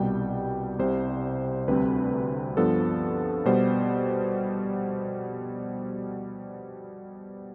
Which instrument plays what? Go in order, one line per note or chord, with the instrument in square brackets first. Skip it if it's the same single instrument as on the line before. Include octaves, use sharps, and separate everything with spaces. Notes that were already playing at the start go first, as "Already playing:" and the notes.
Already playing: [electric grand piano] C2 B2 G3 G5
C2 C3 G3 C5
D2 C3 G3 C4 B4
G2 F3 B3 A4
B2 G3 B3 C5